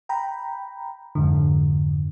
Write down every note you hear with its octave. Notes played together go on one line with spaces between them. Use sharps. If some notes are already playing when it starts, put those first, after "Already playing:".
G5 A#5 B5
F2 G#2 D3